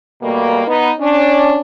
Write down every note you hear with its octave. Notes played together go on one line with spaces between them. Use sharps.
B2 G3 A3 A#3
B3 D#4
C#4 D4